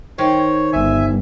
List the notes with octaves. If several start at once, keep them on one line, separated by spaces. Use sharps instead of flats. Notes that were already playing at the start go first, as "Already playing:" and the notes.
D#3 C5 C#5
G1 E5 G#5